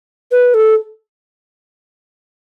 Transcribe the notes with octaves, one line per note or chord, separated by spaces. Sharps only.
B4
A4